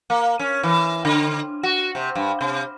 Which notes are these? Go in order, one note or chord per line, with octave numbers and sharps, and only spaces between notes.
A#3
C#4
E3
D3
F#4
C3
G2
C3